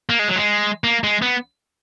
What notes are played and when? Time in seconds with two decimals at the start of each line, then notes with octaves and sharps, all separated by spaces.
0.09 A#3
0.19 G#3
0.28 F#3
0.36 G#3
0.84 A#3
1.04 G#3
1.22 B3